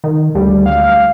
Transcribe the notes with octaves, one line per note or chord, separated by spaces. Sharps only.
D#3
D2 G3
F5